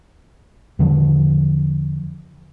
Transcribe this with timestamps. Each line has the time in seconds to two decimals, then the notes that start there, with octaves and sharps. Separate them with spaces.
0.79 E2 D3 F3